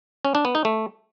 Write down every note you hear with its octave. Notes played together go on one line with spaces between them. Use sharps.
C#4
D4
B3
D#4
A3